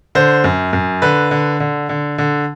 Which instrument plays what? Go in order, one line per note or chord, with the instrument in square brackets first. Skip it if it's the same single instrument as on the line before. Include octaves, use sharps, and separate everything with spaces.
[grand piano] D3 C5
F#2
F#2
D3 B4
D3
D3
D3
D3